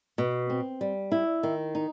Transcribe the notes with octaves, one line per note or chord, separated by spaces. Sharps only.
B2
C4
G3
E4
D#3
D#4